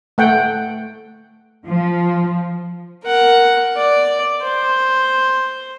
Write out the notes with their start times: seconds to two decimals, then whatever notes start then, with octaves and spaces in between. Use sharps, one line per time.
0.18 A3 F#5 G5
1.66 F3
3.04 A#4 F#5
3.77 D5
4.42 C5